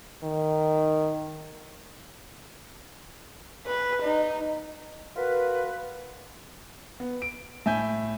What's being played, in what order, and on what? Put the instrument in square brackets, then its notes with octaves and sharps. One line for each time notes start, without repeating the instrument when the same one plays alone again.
[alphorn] D#3
[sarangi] B4
D#4
[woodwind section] F4 F#4 A#4 B4
[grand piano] B3
D7
A2 E5 G#5 G6